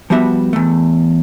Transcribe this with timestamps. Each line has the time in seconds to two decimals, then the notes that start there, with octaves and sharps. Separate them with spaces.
0.10 F3 G3 B3 F#4 E5
0.53 E2 A3